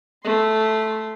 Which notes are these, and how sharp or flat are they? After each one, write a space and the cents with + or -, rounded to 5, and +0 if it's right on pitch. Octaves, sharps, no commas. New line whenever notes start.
A3 -5 C6 +0